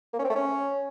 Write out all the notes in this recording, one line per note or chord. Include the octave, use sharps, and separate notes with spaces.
A#3
C#4
C4
A3
C#4